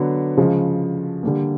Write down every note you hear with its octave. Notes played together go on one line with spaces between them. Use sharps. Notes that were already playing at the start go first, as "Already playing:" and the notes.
Already playing: D3 F#3 B3
C#3 F3 G#3
D3 G3 A#3